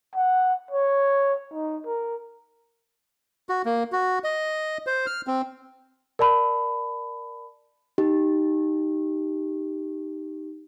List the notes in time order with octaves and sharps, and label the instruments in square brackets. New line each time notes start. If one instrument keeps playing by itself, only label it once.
[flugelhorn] F#5
C#5
D#4
A#4
[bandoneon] F#4
A#3
F#4
D#5
C5
F6
C4
[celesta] A#4 D5 A5 B5
[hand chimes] D#4 G4